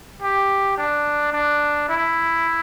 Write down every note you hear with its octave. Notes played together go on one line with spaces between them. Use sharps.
G4
D4
D4
E4